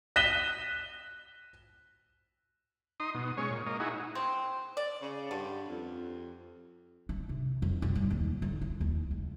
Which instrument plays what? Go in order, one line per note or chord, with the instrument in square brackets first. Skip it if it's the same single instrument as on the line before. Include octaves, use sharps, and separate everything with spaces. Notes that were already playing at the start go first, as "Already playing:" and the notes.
[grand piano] F#6 A#6 B6 D#7 E7 G7
[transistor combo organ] D#4 C6 D#6
B2
G#3 C#4 C#5
A#2
A#3 D#5
D#4 E4 F#4 G#4
[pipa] C4
D5
[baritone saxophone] C#3
[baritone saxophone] G2 [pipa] D3
[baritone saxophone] F2
[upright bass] D4
C3
F2
B2
G2
D#2
D3
E4
D#2
C#2